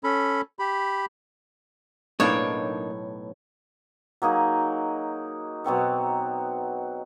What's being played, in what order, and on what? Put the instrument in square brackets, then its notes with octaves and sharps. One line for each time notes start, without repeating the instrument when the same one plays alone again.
[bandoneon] C#4 A4 B5
G4 B5
[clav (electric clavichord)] B1 A2 [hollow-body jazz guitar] A#3 D4 D#4 [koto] C#5
[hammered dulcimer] F#3 A#3 D#4 G#4
B2 F#3 C4 F#5